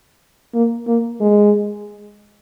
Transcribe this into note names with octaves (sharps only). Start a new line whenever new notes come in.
A#3
A#3
G#3